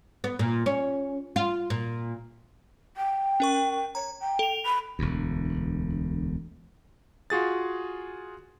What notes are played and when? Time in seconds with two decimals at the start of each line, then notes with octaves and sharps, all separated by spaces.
0.24 B3
0.39 A#2
0.66 C#4
1.36 F4
1.70 A#2
2.97 G5
3.40 C#4 A#4 C#6
3.95 C#5 A#5
4.21 G5
4.39 A4 F7
4.66 B5
4.99 E1 D2
7.30 F4 F#4 G#4 A6